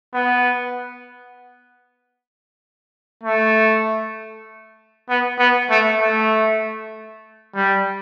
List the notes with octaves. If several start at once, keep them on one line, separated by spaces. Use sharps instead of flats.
B3
A3
B3
B3
A3
A3
G3